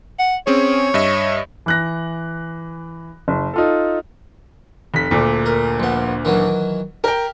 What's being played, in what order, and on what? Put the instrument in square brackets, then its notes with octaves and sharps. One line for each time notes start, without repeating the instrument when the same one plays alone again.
[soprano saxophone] F#5
[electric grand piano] C4 C#4 G#4 [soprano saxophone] C#5
[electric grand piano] G2 D#5 E5
[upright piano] E3 F#6 A#6
F#1
D#4 F4 A4
[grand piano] F1 B6
D2 A#2 D3
[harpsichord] A#4
A#1 B3
D#3 E3 F#3
[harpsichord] G4 [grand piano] A#4 G5